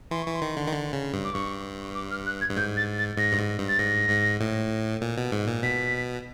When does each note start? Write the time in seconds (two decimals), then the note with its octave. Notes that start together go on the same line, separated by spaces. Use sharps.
0.11 E3 C6
0.23 E3 C#6
0.35 C6
0.42 D#3
0.57 D3
0.68 D#3
0.73 D3
0.93 C#3
1.13 G2
1.24 D6
1.34 G2 C#6
1.95 D6
2.11 F6
2.26 F#6
2.41 G#6
2.50 G2
2.56 G#2 G6
2.77 A6
2.98 A6
3.17 G#2 A#6
3.32 G2
3.38 G#2
3.58 G2
3.69 A6
3.79 G#2 A#6
4.09 G#2
4.41 A2
5.01 A#2
5.17 B2
5.32 G#2
5.47 A#2
5.63 B2 B6